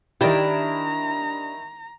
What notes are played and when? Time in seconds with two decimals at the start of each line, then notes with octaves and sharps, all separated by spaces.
0.21 D#3 D4 E4 G4 A#5